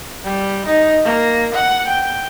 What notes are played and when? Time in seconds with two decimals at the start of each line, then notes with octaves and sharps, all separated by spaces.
0.24 G3
0.66 D#4
1.04 A#3
1.54 F#5
1.87 G5